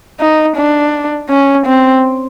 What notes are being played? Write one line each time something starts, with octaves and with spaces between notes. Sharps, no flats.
D#4
D4
C#4
C4